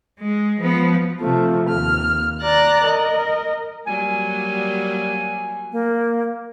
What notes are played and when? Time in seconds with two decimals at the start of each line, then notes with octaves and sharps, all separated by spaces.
0.20 G#3
0.60 F3 B3
1.20 C3 F3 A3
1.69 D#2 F6
2.41 D5 A#5 F#6 A6
2.84 A#4 D#5
3.87 F#3 G3 A#3 G#5
5.72 A#3